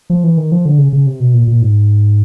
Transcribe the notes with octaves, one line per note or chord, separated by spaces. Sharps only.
F3
E3
D#3
F3
D3
C#3
C#3
C3
B2
A#2
A#2
G#2